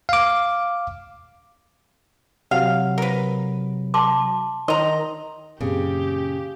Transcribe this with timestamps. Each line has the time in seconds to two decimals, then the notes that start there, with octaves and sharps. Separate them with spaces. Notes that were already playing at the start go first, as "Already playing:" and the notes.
0.09 F5 D6
2.51 C3 F#3 F5 F#5
2.98 A#4 B4
3.94 A5 C6 D6
4.68 D#3 D#4 D#5 A#5 C6
5.61 F#2 A#2 C#3 C4 G4